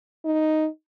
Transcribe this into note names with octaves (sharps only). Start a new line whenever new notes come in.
D#4